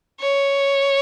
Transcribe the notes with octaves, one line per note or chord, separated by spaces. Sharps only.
C#5